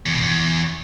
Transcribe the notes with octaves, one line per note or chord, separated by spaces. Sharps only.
E2
B2
E2